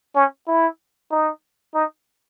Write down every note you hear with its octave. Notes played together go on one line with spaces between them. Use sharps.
C#4
E4
D#4
D#4